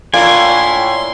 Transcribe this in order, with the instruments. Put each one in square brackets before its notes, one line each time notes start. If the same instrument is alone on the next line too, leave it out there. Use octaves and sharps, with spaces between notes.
[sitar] A2 E4 D5 [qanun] A#3 F4 [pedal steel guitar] G#5 [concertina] C6